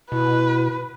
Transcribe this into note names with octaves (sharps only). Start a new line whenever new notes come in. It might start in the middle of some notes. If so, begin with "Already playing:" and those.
B2 E4 B4